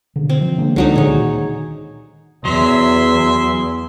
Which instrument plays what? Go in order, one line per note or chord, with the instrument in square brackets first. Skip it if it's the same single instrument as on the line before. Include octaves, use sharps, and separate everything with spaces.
[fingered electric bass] B2 D3
[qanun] C4
[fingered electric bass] F3
D3 G#3 A#3
[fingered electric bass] C#2 G#3 [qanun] D3 F#3 D#4
[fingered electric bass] A#2 D#3 [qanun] G#4 C#5
[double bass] E2 [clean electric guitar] F#3 [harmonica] E5 C6